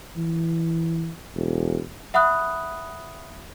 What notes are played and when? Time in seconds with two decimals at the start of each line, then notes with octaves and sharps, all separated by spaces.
0.16 E3
1.35 E1
2.14 E5 F#5 B5 D#6 F#6